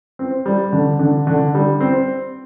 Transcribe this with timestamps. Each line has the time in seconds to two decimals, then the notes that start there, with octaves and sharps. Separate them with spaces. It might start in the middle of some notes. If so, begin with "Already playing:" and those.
0.19 C4
0.46 G3
0.73 D3
0.99 D3
1.27 D3
1.55 G3
1.80 C4